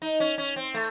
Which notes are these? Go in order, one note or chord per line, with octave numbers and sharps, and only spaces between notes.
D#4
C#4
C#4
C4
A3